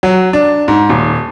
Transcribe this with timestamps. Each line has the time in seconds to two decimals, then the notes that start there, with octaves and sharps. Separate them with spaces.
0.03 F#3
0.33 D4
0.68 G#2
0.89 D#1